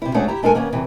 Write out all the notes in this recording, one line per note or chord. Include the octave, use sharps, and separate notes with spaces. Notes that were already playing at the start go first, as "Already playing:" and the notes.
C3 E4
D2 G#3 A3 C#4 D4 F#5
E4 G4 A#5
G#3 D4 A4 A#4 G#5
D#3 A#3 B3 C#4
F#2 C3 E3